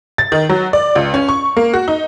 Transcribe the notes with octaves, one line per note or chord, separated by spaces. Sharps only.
A6
D#3
F#3
D5
C#2
C#4
C#6
A#3
F#4
D#4